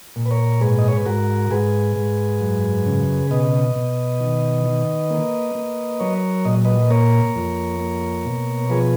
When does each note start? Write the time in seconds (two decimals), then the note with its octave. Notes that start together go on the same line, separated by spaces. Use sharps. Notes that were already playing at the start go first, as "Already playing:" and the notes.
0.16 A#2
0.26 B4
0.31 A#4 C#5
0.61 G#2 G#4 B4
0.79 D#5
0.88 C#5
0.97 B4
1.06 G#2 F#4 A#4
1.51 G#2 G#4 B4
1.96 G#2
2.41 F#2
2.86 C#3
3.31 B2 B4 D#5
3.76 B2
4.20 D#3
4.66 D#3
5.11 A#3
5.55 A#3
6.00 F#3 A#4 C#5
6.45 A#2 D#5
6.65 B4 D#5
6.90 A#3 A#4 C#5
7.35 F2
7.80 A#3
8.25 B2
8.70 F3 G#4 B4